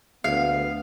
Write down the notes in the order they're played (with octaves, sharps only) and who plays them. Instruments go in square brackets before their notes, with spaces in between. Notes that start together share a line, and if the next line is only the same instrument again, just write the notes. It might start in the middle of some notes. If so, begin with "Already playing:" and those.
[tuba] D2 [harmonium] B3 [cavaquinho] F5